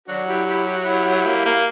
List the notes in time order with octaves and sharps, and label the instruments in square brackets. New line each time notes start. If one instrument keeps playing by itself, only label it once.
[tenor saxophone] F#3 [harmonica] D4 F#4
[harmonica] E4 G4
E4 G4
G4
F#4
E4 G4
[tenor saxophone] A#3
A#3